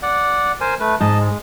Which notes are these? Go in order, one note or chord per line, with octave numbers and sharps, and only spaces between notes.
D5 F#5
A#4 C5 G#5
A3 B4
G#2 D#5 A5
G#3